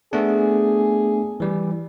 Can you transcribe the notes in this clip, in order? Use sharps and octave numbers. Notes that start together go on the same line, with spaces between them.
A3 B3 D4 G#4
E3 G3